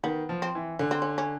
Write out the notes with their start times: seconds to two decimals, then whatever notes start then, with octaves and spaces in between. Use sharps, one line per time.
0.03 D#3 B3
0.29 F3
0.42 C4
0.55 E3
0.79 D3 C#4
0.91 C4
1.02 C#4
1.18 C#4